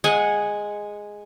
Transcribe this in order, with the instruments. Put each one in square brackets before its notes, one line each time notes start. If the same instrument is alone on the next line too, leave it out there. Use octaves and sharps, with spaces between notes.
[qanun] G#3 F#5 G#5